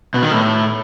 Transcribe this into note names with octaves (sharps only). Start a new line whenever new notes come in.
B2
D#3
A2